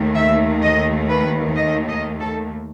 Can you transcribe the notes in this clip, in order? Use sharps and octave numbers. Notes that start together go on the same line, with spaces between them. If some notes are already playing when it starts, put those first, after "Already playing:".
Already playing: D#2 D#3 A3
E5
D#5
B4
D#5
D#5
A4